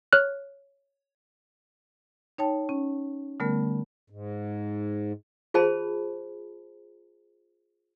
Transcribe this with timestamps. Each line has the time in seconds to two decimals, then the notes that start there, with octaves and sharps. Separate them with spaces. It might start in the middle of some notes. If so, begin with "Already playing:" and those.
0.13 C#5 F6 F#6
2.38 D#4 C#5 G5 A5
2.69 C#4
3.40 D3 G3 A3 B3 A#4
4.10 G#2
5.54 F4 G#4 C5 A5 B5